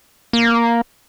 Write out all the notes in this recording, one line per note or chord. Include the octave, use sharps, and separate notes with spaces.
A#3